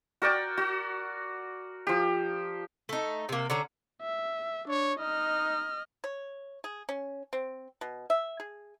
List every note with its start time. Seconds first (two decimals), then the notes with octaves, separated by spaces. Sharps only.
0.22 F#4 A#4 D5 G5
0.57 F#4
1.87 F3 G4
2.89 A3 D#4
3.29 C3 A#3
3.50 D3 C#4 A#5
4.02 E5
4.68 D4 C#5
5.00 D#4 D#5 F6
6.04 C#5
6.64 G#4
6.89 C#4
7.33 C4
7.81 B2
8.10 E5
8.40 G#4